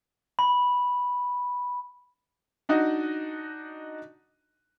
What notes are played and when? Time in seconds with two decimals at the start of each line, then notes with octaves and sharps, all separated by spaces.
0.39 B5
2.69 D4 D#4 F#4 D#5